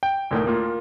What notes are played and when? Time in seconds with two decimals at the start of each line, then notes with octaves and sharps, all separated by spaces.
0.03 G5
0.31 D2 A2 D#3
0.47 A#3 F4